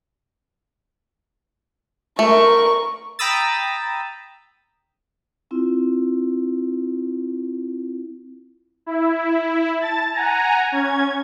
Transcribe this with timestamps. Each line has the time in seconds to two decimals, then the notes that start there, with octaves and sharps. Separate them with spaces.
2.19 A3 A#4 C#6
3.19 G5 A#5 B5 D#6 E6 A6
5.51 C4 E4 F4
8.86 E4
9.81 A5 A6
10.13 F#5 G#5 A#5
10.72 C#4 G#6